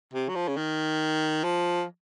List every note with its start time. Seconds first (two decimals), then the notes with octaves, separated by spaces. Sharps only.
0.14 C3
0.29 F#3
0.35 F3
0.48 C#3
0.57 D#3
1.44 F3